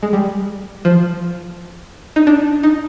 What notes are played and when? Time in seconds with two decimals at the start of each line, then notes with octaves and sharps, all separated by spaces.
0.03 G#3
0.13 G3
0.85 F3
2.16 D#4
2.27 D4
2.63 D#4